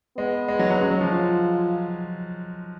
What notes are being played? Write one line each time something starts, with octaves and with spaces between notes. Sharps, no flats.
G#3 B3
G#3
F#3
F#3
G#3 C#4
F#3
F3
F4